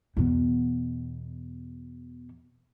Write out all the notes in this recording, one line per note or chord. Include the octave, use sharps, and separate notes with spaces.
E2 B2